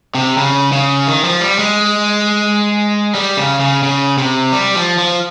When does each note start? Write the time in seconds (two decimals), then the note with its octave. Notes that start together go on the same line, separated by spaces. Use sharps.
0.15 C3
0.38 C#3
0.72 C#3
1.07 D#3
1.24 F3
1.41 G3
1.59 G#3
3.15 G3
3.37 C#3
3.60 C#3
3.83 C#3
4.18 C3
4.52 G3
4.75 F3
4.99 F3